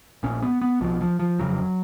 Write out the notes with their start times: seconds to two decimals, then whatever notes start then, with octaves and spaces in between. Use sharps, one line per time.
0.23 A#1 A#2 C#4
0.42 B3
0.62 B3
0.81 B1 B2 F3
1.01 F3
1.19 F3
1.39 F#1 F2 C#3 F#3